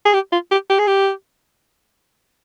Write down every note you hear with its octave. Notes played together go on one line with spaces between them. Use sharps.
G#4
G4
F4
G4
G4
G#4
G4